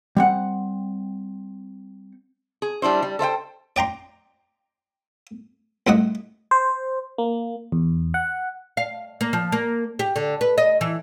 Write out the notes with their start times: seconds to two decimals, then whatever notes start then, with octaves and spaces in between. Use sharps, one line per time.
0.17 G3 C4 F#5
2.62 G#4
2.82 G3 D4 E4 C5
3.02 G3
3.19 A4 C5 E5 G5
3.76 D5 G5 A#5 C6
5.87 C2 A3 D#5 F#5
6.51 C5
7.18 A#3
7.72 E2
8.14 F#5
8.77 F5
9.21 A#3
9.33 F3
9.52 A#3
9.99 G4
10.16 D3
10.41 B4
10.58 D#5
10.81 E3